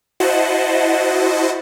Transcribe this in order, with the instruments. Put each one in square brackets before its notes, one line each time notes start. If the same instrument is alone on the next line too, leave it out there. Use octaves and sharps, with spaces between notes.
[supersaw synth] E4 F#4 C5 D#5 F#5 A5